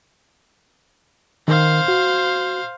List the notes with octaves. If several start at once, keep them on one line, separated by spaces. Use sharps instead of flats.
D#3 D#4 A#4 C5 F5
F#4